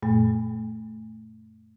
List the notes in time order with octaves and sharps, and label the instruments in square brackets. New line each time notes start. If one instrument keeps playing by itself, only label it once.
[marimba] F#2 A#2 A3